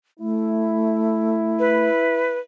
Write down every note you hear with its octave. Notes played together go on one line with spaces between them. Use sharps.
A3 E4
B4